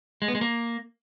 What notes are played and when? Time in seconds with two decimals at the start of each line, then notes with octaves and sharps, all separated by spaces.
0.22 G#3
0.28 B3
0.35 G#3
0.41 A#3